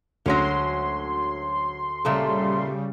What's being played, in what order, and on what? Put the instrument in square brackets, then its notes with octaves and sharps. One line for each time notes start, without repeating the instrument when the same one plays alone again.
[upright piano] D2 C#5 A#6 [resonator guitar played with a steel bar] F#3 G#3 C#4 [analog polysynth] C6
[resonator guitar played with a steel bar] A#2 A3 A4 [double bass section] C#3 G3